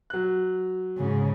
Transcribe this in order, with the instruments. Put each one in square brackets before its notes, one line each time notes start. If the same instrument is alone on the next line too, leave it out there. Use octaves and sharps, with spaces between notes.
[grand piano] F#3 F#6
[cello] G#2 C#3